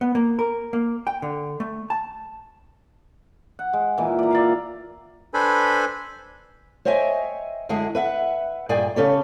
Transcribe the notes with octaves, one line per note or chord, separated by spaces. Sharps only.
B3
A#3
A#4
A#3
G5
D3
A3
A5
F#5
G#3
A#2 E3
D5 A#5
D5 E5 F5
D4 A4 B4 C5 G#5 B5
C5 C#5 D#5 E5 G5 G#5
F#2 D3 G#3 E4 G#4
B4 E5 F#5
G2 A#2 G#4 D5 G5 G#5
C#3 C#4 G4 A4